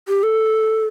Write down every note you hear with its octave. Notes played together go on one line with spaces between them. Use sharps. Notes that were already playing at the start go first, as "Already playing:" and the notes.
G4
A4